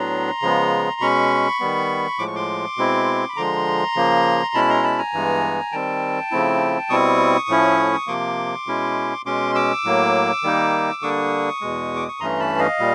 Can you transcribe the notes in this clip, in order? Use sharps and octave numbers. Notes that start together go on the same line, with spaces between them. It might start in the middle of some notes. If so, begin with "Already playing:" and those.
Already playing: A2 F#3 B3 D4 A#5 C6
C#3 F3 G#3 B3
B2 G#3 C#4 B5 C#6
D#3 G3 B3
A2 F3 G#3 D6
C#6
C6 D6
B2 G#3 C4 E4
B5
D3 F3 G#3 A#5 C6
C#3 F3 A#3
B2 G#3 C#4 E4 A5 B5
A#5 C6
A5 B5
G#5 A#5
G2 E3 G#3 B3
D#3 G3 C4 G5 A5
C#3 F3 A3 C4 E4
B2 G3 C4 E4 C#6 D#6
A2 F3 A3 C#4 E4
C3 F3 A#3 C6 D6
B2 G#3 C#4 E4
B2 G#3 C#4 C6 D6
D6 E6
A2 F#3 A#3
D#3 G3 A#3 D#4
D3 G3 A#3 D4 C#6 D#6
E2 B2 G#3
D6
C#6
G2 E3 A3 C#4 A#5 C6
A5 B5
D#5 F5
A#2 G3